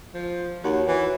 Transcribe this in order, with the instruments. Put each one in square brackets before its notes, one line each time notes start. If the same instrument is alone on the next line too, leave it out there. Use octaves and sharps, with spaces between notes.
[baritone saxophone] F3
[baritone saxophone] D#2 [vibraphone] F#4 C#5 F#5
[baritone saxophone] E3